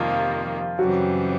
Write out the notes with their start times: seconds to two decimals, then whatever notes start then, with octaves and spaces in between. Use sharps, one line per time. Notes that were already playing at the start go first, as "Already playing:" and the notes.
Already playing: F2 C3 D#3 F3 G3 A#3 F4
0.79 F#2 C#3 E3 F#3 G3 C4 F#4